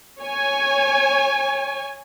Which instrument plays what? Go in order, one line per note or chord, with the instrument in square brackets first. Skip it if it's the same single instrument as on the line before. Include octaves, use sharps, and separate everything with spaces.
[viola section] C#5 G#5